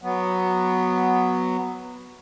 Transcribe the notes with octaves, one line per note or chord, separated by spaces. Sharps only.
F#3 B3